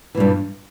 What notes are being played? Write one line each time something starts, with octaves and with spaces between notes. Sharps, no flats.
G2 A#2 E3